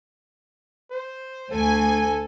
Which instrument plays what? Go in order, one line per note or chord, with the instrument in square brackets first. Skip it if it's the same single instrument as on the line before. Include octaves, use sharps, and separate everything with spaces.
[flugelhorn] C5
[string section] D2 G#5 [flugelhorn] A4